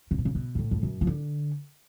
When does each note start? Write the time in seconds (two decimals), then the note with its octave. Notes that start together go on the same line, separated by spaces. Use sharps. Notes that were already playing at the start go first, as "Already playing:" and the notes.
0.11 C#3
0.18 B2
0.25 C#3
0.35 B2
0.55 G#2
0.59 A2
0.71 F2
0.83 F#2
1.01 F3
1.07 D3